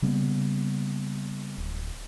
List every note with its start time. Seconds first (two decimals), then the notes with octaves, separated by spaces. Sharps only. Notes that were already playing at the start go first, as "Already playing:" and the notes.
0.02 C#3 G3 A#3 B3
1.58 D1